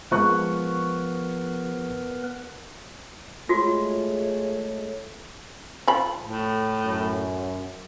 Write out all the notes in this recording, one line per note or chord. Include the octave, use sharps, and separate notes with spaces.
F3 G#3 B3 A#4 B4 C#6 F#6
G#3 A3 F4 F#4 C#5
F3 C5 B5
A2
F#2